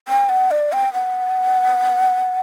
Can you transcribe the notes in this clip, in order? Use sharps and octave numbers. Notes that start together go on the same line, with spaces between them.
G5
F#5
D5
G5
F#5